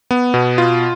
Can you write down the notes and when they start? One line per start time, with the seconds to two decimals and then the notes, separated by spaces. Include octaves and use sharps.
0.11 B3
0.34 B2
0.58 F4